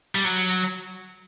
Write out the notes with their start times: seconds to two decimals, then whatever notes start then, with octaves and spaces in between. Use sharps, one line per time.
0.15 G3
0.24 F#3